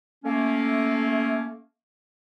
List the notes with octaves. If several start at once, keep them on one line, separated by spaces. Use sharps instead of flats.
A3 A#3 C#4